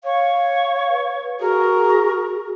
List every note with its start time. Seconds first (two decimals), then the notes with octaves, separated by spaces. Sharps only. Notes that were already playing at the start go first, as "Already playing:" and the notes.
0.04 C#5 F5
0.89 B4
1.40 F#4 G#4 A#4